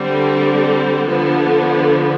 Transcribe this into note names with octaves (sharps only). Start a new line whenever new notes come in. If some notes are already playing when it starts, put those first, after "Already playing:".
Already playing: D3 G3 C4
D3 F3 B3